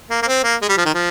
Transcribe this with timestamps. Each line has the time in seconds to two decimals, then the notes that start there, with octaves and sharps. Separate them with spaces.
0.10 A#3
0.22 A#3
0.27 C4
0.44 A#3
0.62 G#3
0.69 G3
0.77 F3
0.85 D#3
0.94 F3